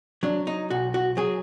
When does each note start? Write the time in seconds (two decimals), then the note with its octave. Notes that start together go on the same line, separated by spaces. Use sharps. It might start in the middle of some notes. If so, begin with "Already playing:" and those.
0.23 F#3 D4
0.47 D#4
0.70 B1 F#4
0.94 F#4
1.17 F#3 G#4